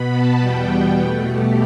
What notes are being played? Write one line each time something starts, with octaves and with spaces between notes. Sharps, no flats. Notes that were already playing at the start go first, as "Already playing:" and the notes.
Already playing: B2 B3 B5
A5
E2 B2 G3 B3 G5
B2 A3
G4